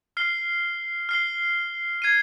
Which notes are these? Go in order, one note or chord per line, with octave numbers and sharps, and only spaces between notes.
F6 C7 G7
F6 C7 G7
G#6 C7 D#7